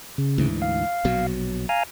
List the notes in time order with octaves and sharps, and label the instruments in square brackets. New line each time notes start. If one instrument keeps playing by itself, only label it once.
[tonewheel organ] C#3
[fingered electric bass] D2 G#2 E3
[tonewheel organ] F5
[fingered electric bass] A#1 B2 F#3
[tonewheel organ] F5 G#5 A#5